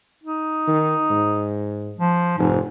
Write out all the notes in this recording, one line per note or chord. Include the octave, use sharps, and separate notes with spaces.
D#4
D#3
G#2
F3
F1 G#2